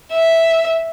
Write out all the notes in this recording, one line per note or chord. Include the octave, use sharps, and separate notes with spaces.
E5